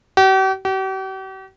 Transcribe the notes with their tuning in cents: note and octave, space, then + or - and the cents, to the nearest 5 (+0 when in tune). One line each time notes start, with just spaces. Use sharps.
G4 -45
G4 -45